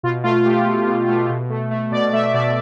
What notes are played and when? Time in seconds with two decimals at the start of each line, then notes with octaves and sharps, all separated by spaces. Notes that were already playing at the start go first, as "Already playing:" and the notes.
0.03 B2 F4
0.24 A3 F4
0.45 A3 G4
0.66 A3
0.87 B2
1.08 A3
1.30 B2
1.50 A3
1.71 A3
1.91 B2 D5
2.13 A3 E5
2.34 B2 D5